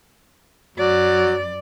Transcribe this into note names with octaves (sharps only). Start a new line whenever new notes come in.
F#2 F#3 D5